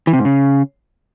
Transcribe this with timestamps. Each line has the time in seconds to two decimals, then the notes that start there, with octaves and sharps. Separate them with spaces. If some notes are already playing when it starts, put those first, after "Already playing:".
0.07 E3
0.13 C3
0.19 G#2
0.25 C#3